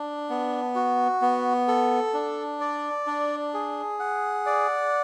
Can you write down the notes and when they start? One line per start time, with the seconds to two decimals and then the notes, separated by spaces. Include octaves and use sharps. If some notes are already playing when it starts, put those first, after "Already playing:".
Already playing: D4
0.30 B3
0.75 F#4
1.22 B3
1.68 A4
2.14 D4
2.60 D5
3.07 D4
3.54 G#4
4.00 F#5
4.46 D5